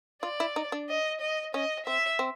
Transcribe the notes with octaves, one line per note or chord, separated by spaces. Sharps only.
F4 D5
E4
D#4
D4
D#5
D#5
C#4 D#5
C4 E5
C4